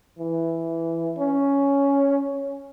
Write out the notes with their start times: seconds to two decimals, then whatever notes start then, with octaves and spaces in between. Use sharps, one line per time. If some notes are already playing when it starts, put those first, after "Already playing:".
0.19 E3
1.18 C#4